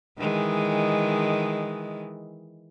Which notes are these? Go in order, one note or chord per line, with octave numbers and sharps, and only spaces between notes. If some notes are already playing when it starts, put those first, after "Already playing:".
D#3 E3 G#3